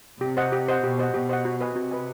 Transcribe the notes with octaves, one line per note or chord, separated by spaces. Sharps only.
C3 G4
C5 D#5 F#5
G4
C5 D#5 F#5
B2 G4
C5 D#5 F#5
B2 G4
C5 D#5 F#5
F#4
B4 D#5 G#5
C3 F#4
B4 D#5 G#5